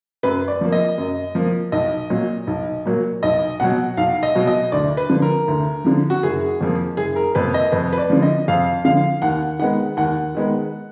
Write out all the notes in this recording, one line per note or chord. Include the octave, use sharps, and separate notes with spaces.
F#2 B4
D5
F3 A#3
D#5
F#2
F3 A#3
B1 D#5
A#2 F#3 A#3
B1
A#2 F#3 A#3
B1 D#5
B2 F#3 F#5
B1 F5
D#5
B2 F#3
D#5
D2 D5
B4
D3 F3
A#4
D2
D3 F3
F#4
F#1 G#4
F2 F3 A#3
F#1 G#4
A#4
F2 F3 A#3 B4
D#5
F2 B4
B4
D5
D3 F3
D#5
F2 F5
D3 F3 F5
D#2 F#5
D#3 G#3 B3 F#5
D#2 F#5
D#3 G#3 B3